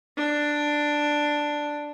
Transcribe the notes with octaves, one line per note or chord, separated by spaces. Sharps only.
D4